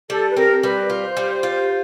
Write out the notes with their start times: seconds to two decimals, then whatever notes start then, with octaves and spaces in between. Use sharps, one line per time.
0.10 G3 A4
0.32 B4
0.36 C4 A#4
0.63 G3 B4
0.90 F4
1.03 C5
1.17 G3
1.43 F4